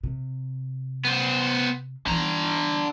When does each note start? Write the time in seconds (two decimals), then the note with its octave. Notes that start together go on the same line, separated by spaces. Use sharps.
0.04 C3
1.05 B3 C5
2.07 D3 E3 D#4 A#5